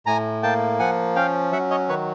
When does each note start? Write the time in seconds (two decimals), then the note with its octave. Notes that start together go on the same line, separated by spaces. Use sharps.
0.06 A2 G#5 A#5
0.43 A#3 G5 A5
0.79 F3 F#5 G#5
1.16 C#4 F5 G5
1.52 F#3 E5 F#5
1.71 C#5 D#5
1.89 D#3 B4 C#5